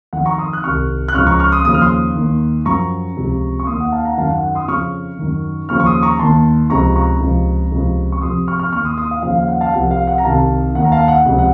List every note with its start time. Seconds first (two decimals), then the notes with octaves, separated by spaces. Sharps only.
0.13 F2 D#3 F#5
0.25 A#5 C#6
0.38 C6 D#6
0.53 F#6
0.64 C2 C3 D#3 C#6 F6
1.08 F#6
1.15 C#2 C#3 F3 C#6 F6
1.27 A#5 C#6
1.39 C#6 F6
1.52 C6 D#6
1.65 D#2 C#3 F3 D#6
1.74 F6
1.82 C6 D#6
2.15 D#2 D#3
2.65 F#2 F3 A#5 C#6
3.17 C#2 C3 F3
3.60 C#6
3.67 D#2 D#3 C6 D#6
3.80 F#5
3.92 F5 A5
4.05 F#5 A#5
4.18 F#2 D#3 F5 A5
4.31 F#5
4.43 F#5
4.55 C6 D#6
4.68 F2 C#3 F3 C#6 F6
5.19 F#2 D#3
5.69 D#2 C#3 F3 C#6 F6
5.80 C#6
5.86 C6 D#6
6.03 A#5 C#6
6.19 D#2 D#3 A5 C6
6.70 C#2 C3 F3 A#5 C#6
6.96 A#5 C#6
7.21 C#2 C3 F3
7.72 C#2 C3 F3
8.12 C#6
8.21 F2 C3 F3 C6 D#6
8.48 C#6 F6
8.59 C#6 F6
8.72 D#2 D#3 C#6 F6
8.85 C6 D#6
8.98 C6 D#6
9.11 F5
9.23 D#2 C#3 F3 F5
9.36 F5
9.48 F#5
9.61 F5 A5
9.74 C2 C3 F3 F#5
9.91 F5
10.07 F#5
10.18 A#5
10.24 C2 C3 D#3 F5 A5
10.75 D#2 D#3 F#5
10.84 A#5
10.92 F5 A5
11.08 F#5
11.26 C#2 C3 F3 F#5
11.38 F#5